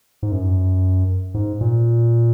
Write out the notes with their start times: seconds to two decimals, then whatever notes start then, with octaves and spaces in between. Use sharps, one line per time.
0.23 G#2
0.32 F#2
1.34 G#2
1.61 A#2